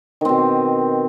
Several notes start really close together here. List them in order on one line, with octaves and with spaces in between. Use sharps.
D#3 C4 B2